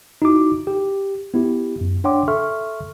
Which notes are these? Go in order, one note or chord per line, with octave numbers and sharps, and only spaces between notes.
D#4 E4 F#4 D6
G4
B3 E4 G4
F#2
D4 C#5 F#5 G5 C6 D6
A4 E5 C6 C#6 F6